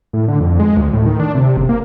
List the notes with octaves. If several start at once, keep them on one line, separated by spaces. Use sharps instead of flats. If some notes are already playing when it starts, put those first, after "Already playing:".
A2
D3
F2
G#3
D2
A2
D#3
D4
C3
F#1
A#3